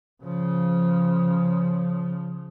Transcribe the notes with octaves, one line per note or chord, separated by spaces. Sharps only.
C#3 F3